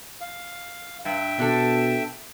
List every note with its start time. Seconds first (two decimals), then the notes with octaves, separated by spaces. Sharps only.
0.21 F5
1.05 G2 E5 G5
1.39 B2 D4 A4